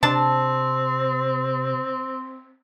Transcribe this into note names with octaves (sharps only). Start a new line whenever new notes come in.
C3 C4 D4 A5